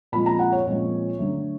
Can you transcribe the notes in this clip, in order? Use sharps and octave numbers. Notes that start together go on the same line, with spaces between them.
A#2 F3 G#3 C4 B5
A#5
F#5
C#5
A#2 F3 G#3 C4
D3 F#3 A3